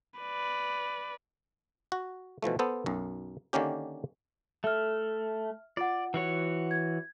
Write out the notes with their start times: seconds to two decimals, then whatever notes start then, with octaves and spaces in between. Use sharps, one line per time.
0.20 B4 D5
1.92 F#4
2.42 B2 E3 F3 A3
2.59 B3 A4 C5
2.86 B1 F#2
3.53 D3 D#3 A#3 C#4 G4
4.64 A3 E5 F6
5.77 F4 D5 F#5
6.14 E3 F#4 C#5
6.71 G#6